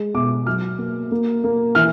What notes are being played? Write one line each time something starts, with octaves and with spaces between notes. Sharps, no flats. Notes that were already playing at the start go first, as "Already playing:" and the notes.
Already playing: G#3
B2 D6
F#3 F6
A#3
A#3
A#3
E3 F6